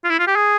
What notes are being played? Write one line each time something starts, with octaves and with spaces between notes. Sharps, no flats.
F4
E4
F4
G4
G#4